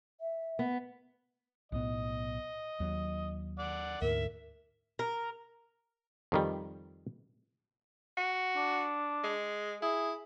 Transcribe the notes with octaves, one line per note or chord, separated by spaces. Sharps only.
E5
B3
B1 A2 B3 D#5
D#2 F#3
D5 F#5
D2 G#2 A#4 E5
A#4
F2 D#3 G3
F#4
D4
G#3
E4 G#4